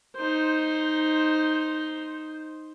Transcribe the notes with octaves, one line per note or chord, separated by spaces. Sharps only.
D#4 C5